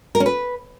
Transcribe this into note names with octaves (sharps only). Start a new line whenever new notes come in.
A#4
C#4
B4